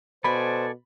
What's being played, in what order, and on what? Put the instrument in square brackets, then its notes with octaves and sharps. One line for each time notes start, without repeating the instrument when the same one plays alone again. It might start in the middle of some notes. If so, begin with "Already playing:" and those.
[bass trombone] B2 [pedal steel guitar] A4 D5 G#5 [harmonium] C5 [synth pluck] B5